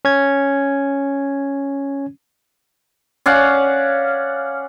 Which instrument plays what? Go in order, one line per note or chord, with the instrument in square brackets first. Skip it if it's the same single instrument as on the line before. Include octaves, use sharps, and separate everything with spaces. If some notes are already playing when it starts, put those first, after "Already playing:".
[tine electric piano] C#4 G#6
[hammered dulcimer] C#4 D5 F5 F#5